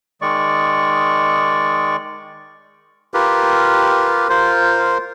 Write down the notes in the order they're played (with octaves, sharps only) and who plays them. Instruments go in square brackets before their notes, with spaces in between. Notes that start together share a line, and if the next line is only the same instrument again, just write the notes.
[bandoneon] D#3 G#3 D5 C#6
[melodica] F4 G4 A#4 B4
F4 A#4 C5